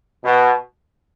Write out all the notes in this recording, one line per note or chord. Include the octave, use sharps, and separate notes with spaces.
B2